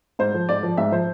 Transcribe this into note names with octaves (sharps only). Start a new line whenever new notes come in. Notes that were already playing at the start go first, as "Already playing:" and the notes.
G#2 C5
F3
G#2 D5
F3
G#2 E5
F3 C5